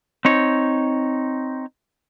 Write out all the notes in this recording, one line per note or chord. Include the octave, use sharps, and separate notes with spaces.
C4 D#4 C#5